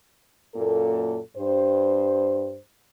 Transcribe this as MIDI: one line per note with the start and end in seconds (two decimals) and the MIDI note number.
0.55 1.19 42
0.55 1.19 46
0.55 1.19 58
0.55 1.19 69
1.37 2.58 43
1.37 2.58 72